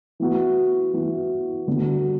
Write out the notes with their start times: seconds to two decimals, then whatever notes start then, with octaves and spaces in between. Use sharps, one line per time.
0.20 E3 B3 F#4
0.93 E3 B3 F#4
1.67 D3 G3 B3 F#4